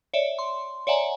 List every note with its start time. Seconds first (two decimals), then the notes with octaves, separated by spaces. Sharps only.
0.13 C#5 D5 E5
0.39 C6
0.87 C#5 D5 E5 F#5 G#5 A#5